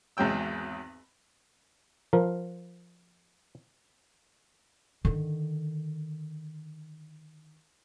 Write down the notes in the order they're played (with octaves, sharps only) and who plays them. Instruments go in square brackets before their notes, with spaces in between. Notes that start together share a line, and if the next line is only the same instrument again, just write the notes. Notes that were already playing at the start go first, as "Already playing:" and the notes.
[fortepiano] G#1 E2 G#2 F#3 G5 E6
[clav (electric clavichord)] F3 A#4
[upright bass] D3 D#3